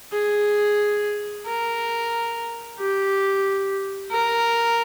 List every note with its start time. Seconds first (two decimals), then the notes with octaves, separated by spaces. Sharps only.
0.12 G#4
1.46 A#4
2.79 G4
4.12 A#4